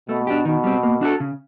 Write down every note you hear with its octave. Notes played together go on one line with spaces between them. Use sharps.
B2 A3
D4 G4
B2 D#3
G3 C4
A#3
D4 F#4 A4
C#3